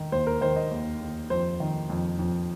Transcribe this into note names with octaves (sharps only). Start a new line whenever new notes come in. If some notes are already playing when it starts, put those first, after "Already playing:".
Already playing: D#3
D#2 C5
A#4
D#3 C5
D#5
D#2
D#2
F2 C5
D#3
F2
F2